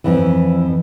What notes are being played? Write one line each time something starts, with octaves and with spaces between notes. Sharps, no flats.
F2 E3